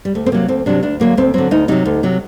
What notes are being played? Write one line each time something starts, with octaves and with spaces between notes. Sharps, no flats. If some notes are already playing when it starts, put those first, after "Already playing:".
G3
D2 A3
C4
C3 F#3 A#3
D2 C4
C3 F#3 D4
D2 D4
D3 F#3 A#3
D2 C4
D3 F#3 C4
D2 D#4
C3 F#3 D#4
D2
C3 F#3